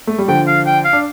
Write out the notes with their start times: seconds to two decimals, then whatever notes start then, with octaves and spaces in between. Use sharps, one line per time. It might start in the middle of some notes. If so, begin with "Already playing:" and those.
0.07 A3
0.18 G3
0.28 D3 F3 G5
0.47 F5
0.66 G5
0.85 F5
0.93 D4